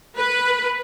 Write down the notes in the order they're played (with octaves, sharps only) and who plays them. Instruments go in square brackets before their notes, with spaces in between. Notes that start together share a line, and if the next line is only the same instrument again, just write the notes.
[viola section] B4